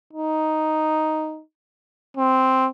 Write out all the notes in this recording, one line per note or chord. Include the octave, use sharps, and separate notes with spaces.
D#4
C4